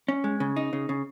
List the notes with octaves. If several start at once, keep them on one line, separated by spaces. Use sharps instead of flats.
C#4
G#3
C#3
D#4
C#3
C#3